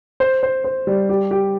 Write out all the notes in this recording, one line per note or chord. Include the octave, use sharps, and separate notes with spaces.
C5
C5
C5
G3
G4
G4